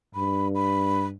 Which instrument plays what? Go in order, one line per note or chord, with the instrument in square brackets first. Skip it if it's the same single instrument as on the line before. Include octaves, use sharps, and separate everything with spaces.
[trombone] G2 [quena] B5
[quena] B5